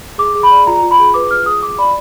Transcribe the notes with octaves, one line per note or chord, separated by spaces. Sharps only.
G#4 D6
G#4
B5
D5
F4 A#5
F4
B5
G#4
B4 D6
F4 F6
G#4 D#6
F4 D6
D5 B5